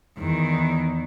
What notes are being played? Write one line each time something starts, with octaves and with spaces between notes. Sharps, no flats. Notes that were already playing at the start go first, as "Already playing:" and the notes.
E2 D#3